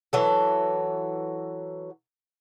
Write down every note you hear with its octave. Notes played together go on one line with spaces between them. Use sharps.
E3 F#3 A4